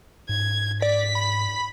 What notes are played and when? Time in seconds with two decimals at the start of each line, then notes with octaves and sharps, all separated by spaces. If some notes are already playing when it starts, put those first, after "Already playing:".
0.29 G#2 G#6
0.82 D5 B6
1.15 B5